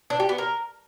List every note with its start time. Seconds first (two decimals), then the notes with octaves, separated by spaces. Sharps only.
0.10 D4
0.20 G4
0.29 B3
0.38 A#4